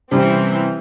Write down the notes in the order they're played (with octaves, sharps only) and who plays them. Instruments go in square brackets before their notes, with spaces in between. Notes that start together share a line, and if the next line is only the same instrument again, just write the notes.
[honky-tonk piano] C3 G3 C#4 [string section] E3 C4